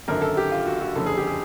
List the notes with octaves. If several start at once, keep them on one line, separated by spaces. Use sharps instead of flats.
G#1 F#2 D3 A#4
A4
G4
F4
F#4
F#4
F#1 F2 D3 A4
G#4
G4
G#4